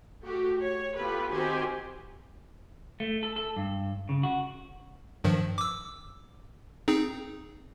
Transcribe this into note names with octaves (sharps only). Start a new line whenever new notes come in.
A3 F#4 G4
C#5
B3 F4 G4 A4 B4
D#3 C4 F#4 G4 C5 G#5
A3
A4
A4
G2
C#3
F#4
G2 D#3 F3
D6 E6
C4 D#4 G#4